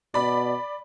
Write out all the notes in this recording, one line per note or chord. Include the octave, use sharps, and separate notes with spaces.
B2 D5 B5